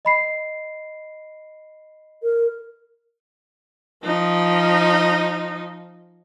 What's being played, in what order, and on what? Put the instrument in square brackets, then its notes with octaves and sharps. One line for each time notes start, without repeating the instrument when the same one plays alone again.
[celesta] D#5 B5 C7
[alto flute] A#4
[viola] F3 D#4